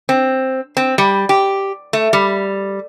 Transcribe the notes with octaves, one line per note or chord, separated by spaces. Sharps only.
C4
C4
G3
G4
A3
G3